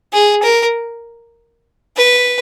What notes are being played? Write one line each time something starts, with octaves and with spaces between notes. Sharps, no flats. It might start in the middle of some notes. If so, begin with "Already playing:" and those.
G#4
A#4
B4